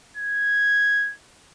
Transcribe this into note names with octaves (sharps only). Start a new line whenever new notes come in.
G#6